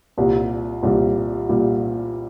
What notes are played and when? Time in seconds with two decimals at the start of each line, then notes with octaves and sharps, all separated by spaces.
0.17 C2 A#2 G3
0.83 C2 A#2 G3
1.49 A#2 G3